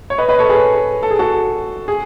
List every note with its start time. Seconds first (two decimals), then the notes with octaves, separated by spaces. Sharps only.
0.10 C#5
0.18 B4 D#5
0.28 B4 D#5
0.39 A4 C#5
0.49 G#4 B4
1.03 A4
1.11 G#4
1.19 F#4 A4
1.88 G#4